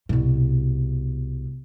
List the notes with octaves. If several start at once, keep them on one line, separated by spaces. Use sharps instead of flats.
C2 B2